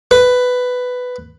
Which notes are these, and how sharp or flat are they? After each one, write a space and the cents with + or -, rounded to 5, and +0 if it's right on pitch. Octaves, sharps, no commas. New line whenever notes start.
B4 +10